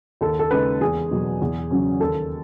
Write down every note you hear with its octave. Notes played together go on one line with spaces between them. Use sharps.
D#2 A4
A4
C#3 G#3 D#4 B4
E2 G#4
B2 F#3
E2
C#3 F#3 C#4
D#2 A4